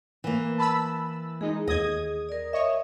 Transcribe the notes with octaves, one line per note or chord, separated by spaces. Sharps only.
E3 A#3
A5 B5 E6
G#3 D#4 G#4
D#2 D#5 D#6 G#6
A#4 D5
C#5 D#5 E5